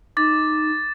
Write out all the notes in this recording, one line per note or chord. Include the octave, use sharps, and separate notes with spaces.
D#4 D6 A6